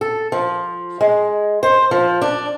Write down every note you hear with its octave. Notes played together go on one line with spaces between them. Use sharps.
A4
F3
G#3
C5
F3
D4